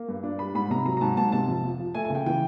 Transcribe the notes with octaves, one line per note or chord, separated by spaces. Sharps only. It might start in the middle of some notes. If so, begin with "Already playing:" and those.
Already playing: A#3
G2
D4
G3 B5
G#2 B5
C3 A#5
F#3 A#5
A#5
G#2 A5
G#2 A5
C3 A5
F2
F3
F3
A3 G#5
G#5
C#3
G5
E3 G5